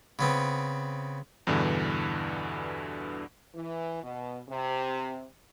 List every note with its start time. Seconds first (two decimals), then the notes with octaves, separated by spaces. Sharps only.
0.19 C#3 B3 C4
1.47 E2 G2 B2 D3 E3
3.55 E3
4.03 B2
4.49 C3